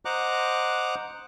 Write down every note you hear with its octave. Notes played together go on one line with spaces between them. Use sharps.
C5 D#5 F#5 A#5 D6 F#6